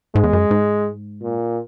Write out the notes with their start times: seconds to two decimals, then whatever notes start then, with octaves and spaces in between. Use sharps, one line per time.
0.15 G#2 G#3
0.24 E2
0.33 F#2
0.51 G#2
1.22 A#2